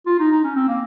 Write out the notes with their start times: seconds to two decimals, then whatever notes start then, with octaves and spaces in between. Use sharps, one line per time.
0.06 F4
0.19 D#4
0.32 D#4
0.44 C#4
0.56 C4
0.68 A#3